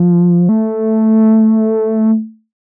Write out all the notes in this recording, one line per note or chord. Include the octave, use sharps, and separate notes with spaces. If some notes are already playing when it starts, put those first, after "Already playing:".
Already playing: F3
A3